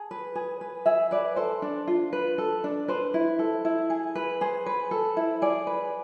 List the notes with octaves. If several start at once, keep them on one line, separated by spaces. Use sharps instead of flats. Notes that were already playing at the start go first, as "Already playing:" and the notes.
Already playing: G#4 A5
B4
G#4
B4
G#4 E5
B4 D5
A4 C5
D4
F4
B4
A4
D4
B4 C5
E4
A4
E4
G#4
B4
G#4 C5
B4
A4
E4
G#4 D5
B4